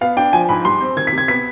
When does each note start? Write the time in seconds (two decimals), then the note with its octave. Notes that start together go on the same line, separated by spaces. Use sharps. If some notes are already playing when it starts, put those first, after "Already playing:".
0.01 B3 F5
0.17 D4 G5
0.33 F3 G#5
0.49 G#2 B5
0.64 G3 C6
0.81 C4
0.97 D#3 G#6
1.07 B6
1.13 C3
1.18 G#6
1.28 B3 B6